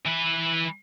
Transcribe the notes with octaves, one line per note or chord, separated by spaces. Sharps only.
E3 B4